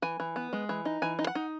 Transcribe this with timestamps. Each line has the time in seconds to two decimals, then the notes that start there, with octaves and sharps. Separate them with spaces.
0.02 E3 G#5
0.20 E3
0.36 B3
0.53 G#3
0.69 E3
0.85 D#4
1.02 E3 G#5
1.19 D#4
1.27 F#5
1.35 D#4